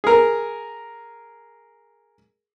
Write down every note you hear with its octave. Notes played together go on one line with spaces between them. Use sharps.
G#4 A#4